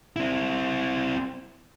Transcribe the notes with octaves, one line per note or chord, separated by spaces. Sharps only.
C4 E4